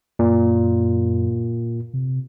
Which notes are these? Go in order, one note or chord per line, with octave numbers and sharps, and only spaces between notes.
F#2 A#2
C3